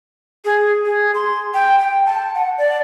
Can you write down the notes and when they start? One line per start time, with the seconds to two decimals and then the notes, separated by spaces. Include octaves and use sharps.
0.45 G#4
0.86 G#4
1.15 C6
1.54 G5
1.79 G5
2.06 A5
2.35 F#5
2.58 D5